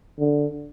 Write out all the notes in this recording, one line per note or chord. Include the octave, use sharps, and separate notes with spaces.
D3